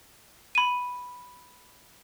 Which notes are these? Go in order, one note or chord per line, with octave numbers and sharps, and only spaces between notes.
B5 D#7